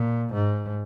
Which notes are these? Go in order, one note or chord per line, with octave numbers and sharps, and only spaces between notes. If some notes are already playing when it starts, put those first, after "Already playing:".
Already playing: A#2
G#2